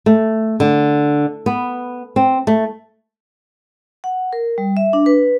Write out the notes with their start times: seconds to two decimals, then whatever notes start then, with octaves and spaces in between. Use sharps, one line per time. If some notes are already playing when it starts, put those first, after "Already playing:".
0.06 A3
0.60 D3
1.46 B3
2.16 C4
2.47 A3
4.04 F#5
4.33 A#4
4.58 G3
4.77 E5
4.93 D4
5.06 B4